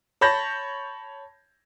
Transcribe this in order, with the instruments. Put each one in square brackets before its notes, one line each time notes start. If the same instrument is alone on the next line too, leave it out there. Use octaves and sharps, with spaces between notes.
[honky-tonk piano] C#5 A5 B5 G6 A#6